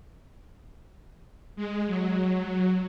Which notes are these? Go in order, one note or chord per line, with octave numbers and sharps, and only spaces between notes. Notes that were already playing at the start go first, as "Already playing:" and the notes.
G#3
F#3